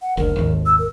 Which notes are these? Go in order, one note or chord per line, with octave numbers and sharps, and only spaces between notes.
F#5
F#1 D2 A#4
G#1 D#2
E6
A#4